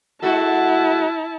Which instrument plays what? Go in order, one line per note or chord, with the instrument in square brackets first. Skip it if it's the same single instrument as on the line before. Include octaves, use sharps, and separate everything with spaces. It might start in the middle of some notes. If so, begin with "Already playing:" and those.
[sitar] G#3 F#4 A4 [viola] E4 A5